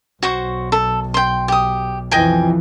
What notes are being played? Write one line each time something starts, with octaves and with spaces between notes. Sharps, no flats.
B1 F#4 C5 C#6
A4
G5 C6
G4 D#6
F2 E3 F3 D#5 G5 G#5